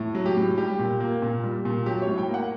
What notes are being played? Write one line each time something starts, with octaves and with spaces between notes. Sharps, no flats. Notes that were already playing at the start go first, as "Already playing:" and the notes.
Already playing: A2
F#3
G4
A2
G3 G4
A#2
A#3
A#2
G3
A#2
F#3 G4
C#5
A2
G5
A#3
F#5